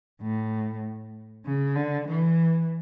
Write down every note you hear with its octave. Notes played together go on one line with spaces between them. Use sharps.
A2
C#3
D3
E3